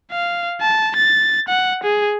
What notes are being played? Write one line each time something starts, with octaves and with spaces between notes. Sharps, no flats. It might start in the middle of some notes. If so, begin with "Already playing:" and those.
F5
A5
A6
F#5
G#4